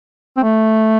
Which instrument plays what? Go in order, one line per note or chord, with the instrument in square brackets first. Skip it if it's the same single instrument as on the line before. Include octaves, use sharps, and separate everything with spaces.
[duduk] C4
A3